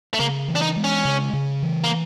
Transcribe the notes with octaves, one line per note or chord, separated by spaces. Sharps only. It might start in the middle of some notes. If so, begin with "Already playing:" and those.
A3
C#3 A#3
E3
D4
D#4
G#3
C#4
C#3
C#3
E3
A#3